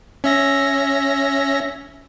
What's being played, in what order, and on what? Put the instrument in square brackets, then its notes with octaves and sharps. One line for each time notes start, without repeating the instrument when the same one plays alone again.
[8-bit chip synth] C#4 E5 A#6